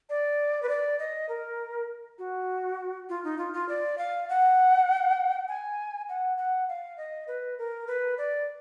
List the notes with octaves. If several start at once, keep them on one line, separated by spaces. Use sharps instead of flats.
D5
B4
D5
D#5
A#4
F#4
F4
D#4
F4
F4
D5
F5
F#5
G#5
F#5
F#5
F5
D#5
B4
A#4
B4
D5